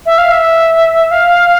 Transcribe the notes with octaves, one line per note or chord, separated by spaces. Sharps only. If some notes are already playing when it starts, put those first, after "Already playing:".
E5
F5
E5
F5